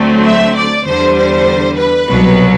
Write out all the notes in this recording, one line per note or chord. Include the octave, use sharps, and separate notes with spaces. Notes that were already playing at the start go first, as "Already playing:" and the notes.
Already playing: D2 D3 F#3 A3 C4
E5
D5
E2 D3 G3 C5
C5
B4
C2 B2 F#3